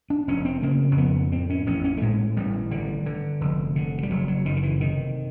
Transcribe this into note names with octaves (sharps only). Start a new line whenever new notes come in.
D4
F1 C#4
C4
C#3 A#3
F2 B3
A2 C4
C#4
A1 C#4
C#4
A3
A2 G#3
A1 G3
D3 G3
D3
F1
D3
G3
F#1 F#3
F#3
F#1 D#3
D#3
E3
C3 D#3